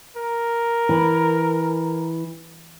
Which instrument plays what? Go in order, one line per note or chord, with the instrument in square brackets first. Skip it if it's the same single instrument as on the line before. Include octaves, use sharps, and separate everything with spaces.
[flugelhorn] A#4
[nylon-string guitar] E3